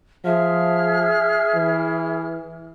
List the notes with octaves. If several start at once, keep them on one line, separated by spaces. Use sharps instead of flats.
F3 G#4 E5 F6
E3